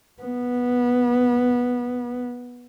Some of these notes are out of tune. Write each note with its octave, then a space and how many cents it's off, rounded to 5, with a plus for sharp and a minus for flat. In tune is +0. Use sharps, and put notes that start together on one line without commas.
B3 -10